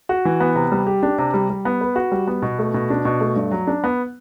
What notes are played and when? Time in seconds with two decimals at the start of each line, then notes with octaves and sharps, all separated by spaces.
0.09 F#4
0.25 E3
0.40 B3
0.55 C3
0.72 G3
0.87 G4
1.03 D4
1.18 C3
1.34 G3
1.50 G3
1.65 B3
1.81 B4
1.96 F#4
2.12 G3
2.27 B3
2.42 B2
2.59 A3
2.74 B2
2.90 D4
3.05 B2
3.21 A3
3.36 G2
3.51 F#3
3.67 D4
3.84 B3